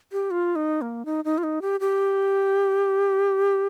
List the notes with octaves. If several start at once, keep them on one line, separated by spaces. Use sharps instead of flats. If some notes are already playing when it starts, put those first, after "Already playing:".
G4
F4
D#4
A#3
D#4
D#4
F4
D#4
G4
G4